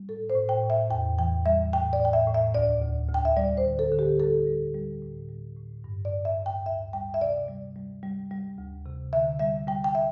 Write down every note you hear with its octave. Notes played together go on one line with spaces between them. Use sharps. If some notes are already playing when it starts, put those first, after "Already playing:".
Already playing: G3
A2 A4
C5
A2
G5
A2
E5
E2 G5
E3 G5
G3 E5
A2 G5
D5
A2
G5
E5
A2
E5
D2 D5
D2
D2
G5
E5
G3 D5
C5
D3
A4
D3
G4
G3 A4
G3
G3
A2
G3
A2
G2
D5
G2
E5
G2
G5
D2 E5
G3 G5
E5
C3 D5
G3
G3
G3
G3
D2
C3
D3 E5
G3 E5
G3 G5
G5
E5